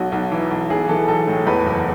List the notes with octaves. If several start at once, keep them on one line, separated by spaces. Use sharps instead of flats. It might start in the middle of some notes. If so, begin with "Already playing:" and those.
Already playing: B1 F#4
B1
E3
B1
B1 G#4
E3 A4
B1 A4
A2
E2 B4
F#1